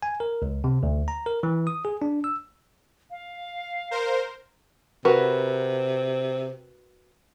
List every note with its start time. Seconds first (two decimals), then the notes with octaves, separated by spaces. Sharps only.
0.03 G#5
0.20 A#4
0.42 C#2
0.64 C3
0.83 D2
1.08 A#5
1.26 A#4
1.43 E3
1.67 D#6
1.85 G#4
2.02 D4
2.24 E6
3.11 F5
3.91 A#4 C5
5.05 C3 F#4 A#4 B4